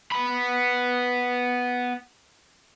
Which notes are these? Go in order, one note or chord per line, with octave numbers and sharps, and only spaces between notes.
B3 B5